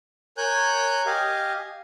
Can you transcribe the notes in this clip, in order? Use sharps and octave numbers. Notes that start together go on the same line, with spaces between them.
A#4 C#5 G#5 F#6 G6
G4 D#5 F5 G#5